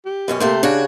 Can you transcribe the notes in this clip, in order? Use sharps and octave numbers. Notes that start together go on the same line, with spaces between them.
G4
F#2 B2 C#4
C3 A3 A#3 C5
C#3 D4 F#4 C#5